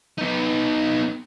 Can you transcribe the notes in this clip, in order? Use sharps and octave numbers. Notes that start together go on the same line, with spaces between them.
B3 D#4